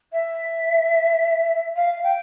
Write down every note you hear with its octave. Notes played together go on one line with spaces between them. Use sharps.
E5
F5
G5